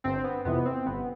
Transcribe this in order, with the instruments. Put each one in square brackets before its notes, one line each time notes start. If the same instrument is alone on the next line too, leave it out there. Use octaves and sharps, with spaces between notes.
[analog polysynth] G1 C4
B3
F2 C3 E3 B3
C4
G1 B3